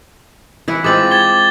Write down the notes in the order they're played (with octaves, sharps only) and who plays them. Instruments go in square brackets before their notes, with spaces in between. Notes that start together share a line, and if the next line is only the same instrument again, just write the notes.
[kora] E3 E4 F#5
[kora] G#3 C4 F4 [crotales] D6 A6 F#7
[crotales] G#6 A6 G7